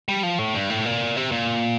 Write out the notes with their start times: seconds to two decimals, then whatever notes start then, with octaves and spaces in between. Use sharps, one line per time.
0.08 G3
0.23 F3
0.39 A2
0.54 G2
0.70 A2
0.85 A#2
1.16 C3
1.32 A#2